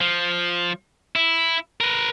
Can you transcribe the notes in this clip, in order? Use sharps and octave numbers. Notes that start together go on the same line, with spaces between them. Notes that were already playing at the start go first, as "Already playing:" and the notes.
F3
E4
A#4 B4